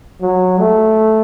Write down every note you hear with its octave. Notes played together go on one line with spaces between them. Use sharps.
F#3
A3